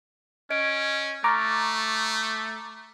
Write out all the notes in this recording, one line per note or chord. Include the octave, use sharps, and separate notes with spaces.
C#4 D#5 G#6 D7
A3 A#5 C#6 D6 F6 A6